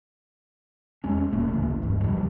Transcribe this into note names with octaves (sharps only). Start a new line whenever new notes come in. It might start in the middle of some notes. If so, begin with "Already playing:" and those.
E2 G#3 C#4
E1 A#2 A3 A#3
A1 D2 C#3 E3
D1 G2
F#2 C3 F3 G3